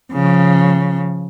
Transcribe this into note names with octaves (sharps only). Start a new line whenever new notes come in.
C#3 F3